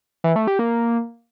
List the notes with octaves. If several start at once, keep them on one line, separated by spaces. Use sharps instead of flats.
E3
A3
G4
A#3